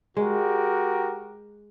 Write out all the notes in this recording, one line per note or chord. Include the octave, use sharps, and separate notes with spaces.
G#3 F#4 G4 A#4